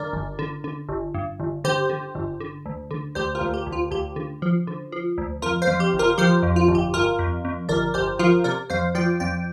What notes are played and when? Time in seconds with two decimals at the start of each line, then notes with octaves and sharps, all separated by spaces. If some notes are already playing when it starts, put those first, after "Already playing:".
Already playing: G2 D3 A#4 D5
0.13 G1
0.39 D3
0.64 D3
0.89 G1
1.14 G2
1.40 G1
1.64 D3 G4 C5
1.89 D3
2.15 G1
2.40 D3
2.66 D2
2.91 D3
3.15 D2 G4 C5
3.35 F4 A#4
3.41 D2
3.54 G4
3.66 D2
3.72 F4
3.91 D2 G4
4.16 D3
4.42 F3
4.67 D3
4.92 F3
5.18 D2
5.42 F2 F4 A#4
5.62 C5 F5
5.67 F2
5.80 G4
5.93 G1
5.99 F4 A#4
6.18 F3 G4 C5
6.43 F2
6.56 F4
6.68 G1
6.75 G4
6.94 G1 F4 A#4
7.19 F2
7.45 F2
7.69 G1 A#4 D5
7.94 G1 G4 C5
8.19 F3 F4 A#4
8.44 C3 A#4 D5
8.70 F2 C5 F5
8.95 F3 D5 G5
9.20 F2 D5 G5